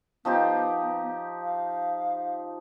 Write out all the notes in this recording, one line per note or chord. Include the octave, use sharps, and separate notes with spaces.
F3 B3 D#4 G4
F5